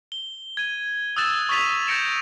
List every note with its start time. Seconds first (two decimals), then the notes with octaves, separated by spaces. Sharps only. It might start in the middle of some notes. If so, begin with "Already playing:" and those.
0.12 G7
0.57 G#6 D#7
1.16 D#6 E6 F#6 A6 E7
1.49 C#6 D#6 A6 B6 D#7 F7
1.87 G6 A6 A#6 C#7 D7 E7